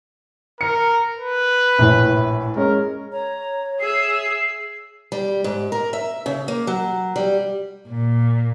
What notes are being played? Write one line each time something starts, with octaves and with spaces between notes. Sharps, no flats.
A#4 C#7
B4
A#1 A2
G#3 C#4 A#4
C#5 A#5
G#4 E5 C7
G3
G#2
A#4
E5
C#3
A#3
F#3
G3
A#2